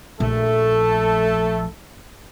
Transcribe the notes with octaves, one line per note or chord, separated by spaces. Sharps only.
A#1 A3 A4